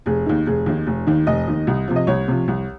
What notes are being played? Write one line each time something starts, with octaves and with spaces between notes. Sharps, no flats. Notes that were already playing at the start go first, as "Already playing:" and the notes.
F1 G#4
D#2 D#3
F1 G#4
D#2 D#3
F1
D#2 D#3
F1 D#5
D#2 D#3
C2
C3 F3
D#5
C2 C#5
C3 F3
C2